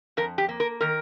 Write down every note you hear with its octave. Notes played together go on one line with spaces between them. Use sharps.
F2 A#4
G4
A#3
A#4
D#3 A#4